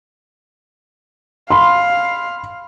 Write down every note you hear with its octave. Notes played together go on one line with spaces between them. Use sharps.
F5 B5 C6